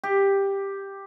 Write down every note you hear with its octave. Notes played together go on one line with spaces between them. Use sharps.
G4